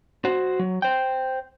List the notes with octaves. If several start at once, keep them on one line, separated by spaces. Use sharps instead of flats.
F#4 C5
F#3
C5 G5